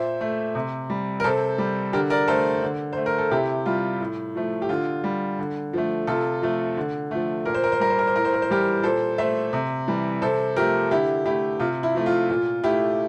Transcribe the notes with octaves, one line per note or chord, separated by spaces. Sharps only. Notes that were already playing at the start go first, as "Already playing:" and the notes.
Already playing: A#2 C5 E5
A3
C3
G3
A#4
C3 A4 C5
G3
D3 G4 A#4
A#4 D5
A3 A4 C5
D3
A3 C5
A#4
A4
C3 E4 G4
G3 F4
A2
F3 A3
G4
D3 F4
G3
D3
F3 A3
C3 F4 A4
F3 A3
D3
F3 A3
A#2 A#4
C5
A#4
C5
G3 A#4
C5
A#4
C5
A2 A#4
C5
A#4
C5
E3 G3 G4 A#4
A#2 A4 C5
A3 C5 E5
C3
E3 G3
C3 A4 C5
F3 A3 G4 A#4
D3 E4 G4
A3 E4 G4
C3 F4
E4
F3 A3
F4
A#2 F4
A3 E4 G4